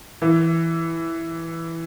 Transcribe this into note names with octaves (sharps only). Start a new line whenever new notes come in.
E3